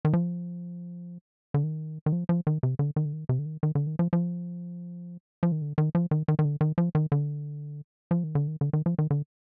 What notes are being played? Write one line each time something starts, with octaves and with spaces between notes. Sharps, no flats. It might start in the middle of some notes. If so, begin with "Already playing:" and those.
D#3
F3
D3
D#3
D#3
F3
F3
D#3
C3
D3
D#3
D3
D#3
C3
D3
D#3
D#3
D3
D#3
F3
F3
F3
D#3
D3
D#3
F3
D#3
D#3
D#3
D3
D#3
F3
D#3
D3
F3
D#3
D3
D#3
D3
D#3
F3
D#3
D3